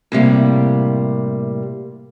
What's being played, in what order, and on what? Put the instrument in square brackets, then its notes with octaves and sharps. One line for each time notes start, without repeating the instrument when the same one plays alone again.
[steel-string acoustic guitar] A2 C3 G3 A#3